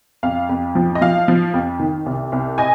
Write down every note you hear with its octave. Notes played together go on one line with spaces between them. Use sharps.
F2 F5
F2
F3
D#5
F3 F5
F3
F2
D#3
C2
C2
D#5 G#5